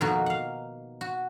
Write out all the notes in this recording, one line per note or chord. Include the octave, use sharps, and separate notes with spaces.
F2 B2 D#3 A#3 F#4
F5 F#5
F#4